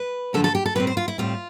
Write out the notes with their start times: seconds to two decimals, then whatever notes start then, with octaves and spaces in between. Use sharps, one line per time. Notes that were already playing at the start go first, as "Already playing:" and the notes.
Already playing: B4
0.33 G2 D3 F3 A3 A4
0.44 A4
0.55 G4
0.66 A4
0.75 A2 G3 C4 B4
0.87 C5
0.97 F4
1.08 E4
1.18 A2 G3 C4 F4